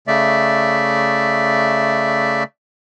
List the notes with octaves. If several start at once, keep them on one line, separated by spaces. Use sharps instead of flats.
C#3 A3 D5 E5